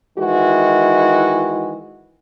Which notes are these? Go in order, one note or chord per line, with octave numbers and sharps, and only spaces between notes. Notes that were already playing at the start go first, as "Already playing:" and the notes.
D#3 E3 G#3 E4 F#4